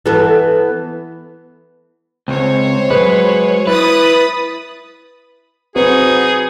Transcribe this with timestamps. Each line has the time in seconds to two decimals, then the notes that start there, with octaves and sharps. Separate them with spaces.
0.06 E3 B3 A4
2.28 C#2 C4 C5 C#5
2.90 F#3 G#3 B4
3.67 E4 B4 B5 D#6 A6
5.76 F#3 C4 D#4 F#4 G#4 B4 C5